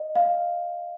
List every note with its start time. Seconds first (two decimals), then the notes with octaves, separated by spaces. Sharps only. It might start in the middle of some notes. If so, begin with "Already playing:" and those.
Already playing: D#5
0.16 F5